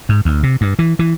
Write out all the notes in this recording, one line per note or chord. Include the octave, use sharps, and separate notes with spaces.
G#2
D2
C3
G2
E3
E3